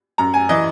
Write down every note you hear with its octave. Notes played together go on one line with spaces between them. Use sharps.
F#2 A#5
G#5
E3 D#5